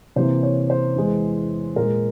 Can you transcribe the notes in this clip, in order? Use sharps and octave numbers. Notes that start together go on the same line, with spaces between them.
C3 E3 A#3 C5
C#5
C5
E2 E3 G#3
A#2 G#3 A#4